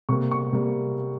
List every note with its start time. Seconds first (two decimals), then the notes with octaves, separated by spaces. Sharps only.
0.09 C3 G3 A#3 C#6
0.31 C#6
0.53 C3 G3 A#3